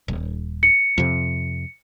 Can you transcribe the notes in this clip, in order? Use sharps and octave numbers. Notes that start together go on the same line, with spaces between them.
D#1
C#7
F2 C3